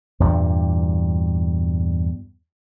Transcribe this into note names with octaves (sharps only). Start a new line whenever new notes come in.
E2 G2 A#2 G3